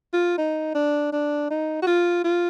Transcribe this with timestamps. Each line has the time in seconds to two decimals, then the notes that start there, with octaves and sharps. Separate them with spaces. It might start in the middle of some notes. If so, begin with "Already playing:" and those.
0.13 F4
0.38 D#4
0.75 D4
1.12 D4
1.50 D#4
1.82 F#4
1.87 F4
2.24 F4